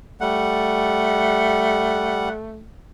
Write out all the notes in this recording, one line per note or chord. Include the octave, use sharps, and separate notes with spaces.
G3 A3 F#5